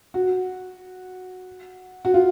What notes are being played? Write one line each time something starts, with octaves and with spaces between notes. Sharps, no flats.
F#4
F#4
F4